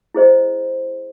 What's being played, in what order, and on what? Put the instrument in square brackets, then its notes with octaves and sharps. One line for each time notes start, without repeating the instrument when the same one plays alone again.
[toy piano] E4 G#4 C5 D#5